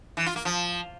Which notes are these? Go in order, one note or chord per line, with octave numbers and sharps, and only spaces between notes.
E3
F4
A#3
F3